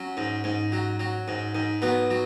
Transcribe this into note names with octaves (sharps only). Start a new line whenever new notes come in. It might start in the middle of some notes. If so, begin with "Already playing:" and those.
Already playing: F#3 C#4
G#2
G#2
F#3
F#3
G#2
G#2
F#3 B3
F#3